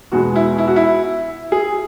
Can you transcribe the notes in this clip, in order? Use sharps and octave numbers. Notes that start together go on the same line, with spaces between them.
E2 B2 G#3 B3 F#4
E4
E4
F#4
E4
G#4